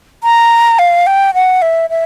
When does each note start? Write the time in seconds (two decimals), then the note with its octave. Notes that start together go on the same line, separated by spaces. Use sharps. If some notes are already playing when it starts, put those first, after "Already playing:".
0.24 A#5
0.79 F5
1.07 G5
1.34 F#5
1.62 E5
1.90 E5